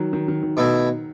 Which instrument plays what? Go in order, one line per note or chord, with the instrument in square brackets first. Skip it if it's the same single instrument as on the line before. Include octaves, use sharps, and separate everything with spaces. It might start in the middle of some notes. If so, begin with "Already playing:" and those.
Already playing: [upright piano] D#3 F#3
D#3
D#3
D#3
[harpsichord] B2 A3 E4